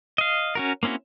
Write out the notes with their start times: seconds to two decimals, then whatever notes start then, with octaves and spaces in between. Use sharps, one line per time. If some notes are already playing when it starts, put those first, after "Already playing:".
0.18 D#5 F5
0.55 C#4 F#4 A#4
0.83 A#3 C4 C#4 E4 F#4